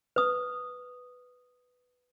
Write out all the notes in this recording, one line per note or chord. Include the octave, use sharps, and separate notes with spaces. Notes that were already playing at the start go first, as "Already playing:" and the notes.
B4 D#6